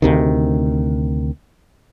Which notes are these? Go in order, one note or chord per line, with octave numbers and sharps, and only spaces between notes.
D2 C3 D#3